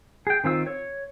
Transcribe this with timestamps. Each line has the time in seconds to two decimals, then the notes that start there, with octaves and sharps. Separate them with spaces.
0.27 G#4 G5
0.44 D#3 C4 F4 E6
0.67 C#5